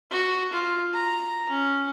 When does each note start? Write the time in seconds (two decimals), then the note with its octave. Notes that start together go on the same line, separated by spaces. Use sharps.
0.11 F#4
0.53 F4
0.94 A#5
1.49 C#4